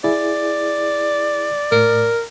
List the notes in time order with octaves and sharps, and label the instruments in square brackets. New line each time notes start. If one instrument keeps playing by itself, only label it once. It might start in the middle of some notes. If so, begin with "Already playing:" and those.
[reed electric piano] E4 G#4 [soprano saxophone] D5
[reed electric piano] A2 [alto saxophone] A#4